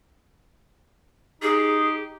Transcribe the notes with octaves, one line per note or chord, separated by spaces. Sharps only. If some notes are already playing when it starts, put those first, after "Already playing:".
D#4 G4 G#4